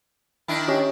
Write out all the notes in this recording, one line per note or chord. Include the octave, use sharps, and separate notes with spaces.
D#3 D4 E4
C#4 G4 D#5